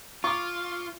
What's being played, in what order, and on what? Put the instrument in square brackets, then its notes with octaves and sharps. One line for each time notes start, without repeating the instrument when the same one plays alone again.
[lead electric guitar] F4 [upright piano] C#6 D6